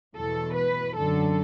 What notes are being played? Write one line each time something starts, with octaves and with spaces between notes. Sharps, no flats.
E2 B2 A4
B4
F#2 D3 A4